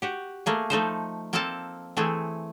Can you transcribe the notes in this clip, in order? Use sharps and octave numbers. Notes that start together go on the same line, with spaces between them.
F#4 G4
A3 A#3 G#4
F3 A3 D#4 C5
A#3 C4 A4 C5 F5 A5
E3 A3 C4 G#4